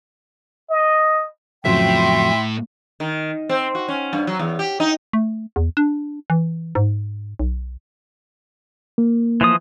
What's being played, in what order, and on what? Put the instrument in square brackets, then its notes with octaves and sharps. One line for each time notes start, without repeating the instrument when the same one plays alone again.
[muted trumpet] D#5
[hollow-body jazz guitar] F2 C#3 F#3 [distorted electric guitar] A2 [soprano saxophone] E5 [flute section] G5 C6
[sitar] D#3
C4
F#4
C#4
G2
F#3
E2
G4
D#4
[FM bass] A3
E2
D4
E3
G#2
B1
[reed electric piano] A#3
[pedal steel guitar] E3 F3 D#6